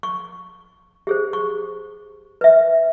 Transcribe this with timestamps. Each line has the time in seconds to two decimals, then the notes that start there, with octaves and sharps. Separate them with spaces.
0.03 C#6
1.07 G4 G#4 C5
1.33 C#6
2.41 B4 E5